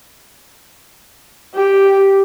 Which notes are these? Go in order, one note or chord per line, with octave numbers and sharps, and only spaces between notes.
G4